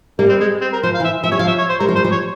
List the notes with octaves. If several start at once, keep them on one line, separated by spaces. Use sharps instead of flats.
G3 A#3
C4
G#3
C4
A#4
F3 C5
F5
E3
E5
F3 E5
G3 C#5
F3 F5
E5
C#5
C5
G3 A#4
F3
G3 C5
F3
C#5